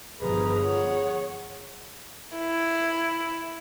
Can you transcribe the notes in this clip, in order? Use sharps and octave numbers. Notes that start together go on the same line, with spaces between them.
G1 D#3 F3 G#4 B4 A#5
C#5 F#5
E4